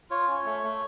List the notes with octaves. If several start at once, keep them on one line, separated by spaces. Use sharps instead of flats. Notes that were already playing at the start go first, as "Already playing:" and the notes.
F4 C#5
C#4
A3
A3